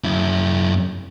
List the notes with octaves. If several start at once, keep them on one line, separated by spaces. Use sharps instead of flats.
F#2 E4